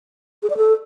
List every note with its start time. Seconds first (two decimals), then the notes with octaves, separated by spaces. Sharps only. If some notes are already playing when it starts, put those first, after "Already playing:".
0.43 G#4
0.50 D5
0.57 A4